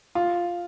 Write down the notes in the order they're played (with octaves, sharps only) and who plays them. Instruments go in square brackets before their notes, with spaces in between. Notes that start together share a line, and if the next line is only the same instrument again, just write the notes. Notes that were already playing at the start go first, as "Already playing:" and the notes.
[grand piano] F4